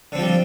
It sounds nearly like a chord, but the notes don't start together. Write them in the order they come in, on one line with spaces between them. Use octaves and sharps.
D3 C4 F3 G3